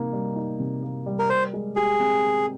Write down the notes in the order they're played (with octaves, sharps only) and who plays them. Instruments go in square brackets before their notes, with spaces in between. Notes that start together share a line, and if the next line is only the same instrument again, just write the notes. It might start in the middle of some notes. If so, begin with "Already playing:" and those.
Already playing: [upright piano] C3 A#3 D#4
G3
D#4
C3
A#3
G3
[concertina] A#4
[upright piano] A#4 [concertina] C5
[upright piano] G#3
[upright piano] G4 [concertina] G#4
[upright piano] C4